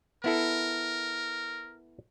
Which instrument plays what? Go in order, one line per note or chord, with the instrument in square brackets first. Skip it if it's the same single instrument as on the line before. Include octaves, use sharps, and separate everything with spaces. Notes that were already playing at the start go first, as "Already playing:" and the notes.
[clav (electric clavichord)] B3 E4 A4 [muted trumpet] A#4